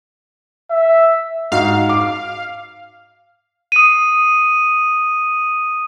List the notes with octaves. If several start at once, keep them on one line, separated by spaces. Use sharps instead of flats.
E5
G#2 F#4 F5
D6
D#6 D#7